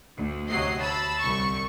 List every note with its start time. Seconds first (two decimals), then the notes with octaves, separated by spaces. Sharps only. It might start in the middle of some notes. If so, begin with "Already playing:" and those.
0.16 D2
0.49 D2 C3 F#3 D#5 C7
0.79 A5 B5 E6
1.21 C2 C#6